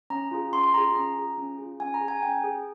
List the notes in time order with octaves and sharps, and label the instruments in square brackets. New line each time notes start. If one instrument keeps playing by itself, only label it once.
[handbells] C#4 A#5
F4 G#4
C#4 C6
C6
F4 A#5
G#4
A#5
C#4 A#5
F4 G#4
C#4
F4 G#4
C#4 G#5
A#5
G#4
G#5
C#4 G5
G#4